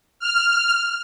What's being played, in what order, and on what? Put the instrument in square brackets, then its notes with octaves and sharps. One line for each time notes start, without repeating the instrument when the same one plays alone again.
[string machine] F6